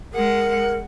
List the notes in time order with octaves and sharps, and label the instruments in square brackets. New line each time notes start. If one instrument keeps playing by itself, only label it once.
[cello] G#3 F#5 [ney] A#4